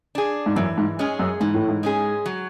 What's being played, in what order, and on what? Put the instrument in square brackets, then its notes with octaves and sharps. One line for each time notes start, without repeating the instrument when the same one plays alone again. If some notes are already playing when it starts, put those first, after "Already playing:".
[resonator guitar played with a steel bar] D4 G#4
[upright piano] G#2
[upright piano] F#2 [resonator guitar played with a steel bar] E3
[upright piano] G#2
[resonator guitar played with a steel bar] G#3 C#4 G#4
[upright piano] F#2
[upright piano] G#2 [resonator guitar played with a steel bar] E3
[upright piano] A2
G#2
[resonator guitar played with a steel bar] G#3 C#4 G#4
F#3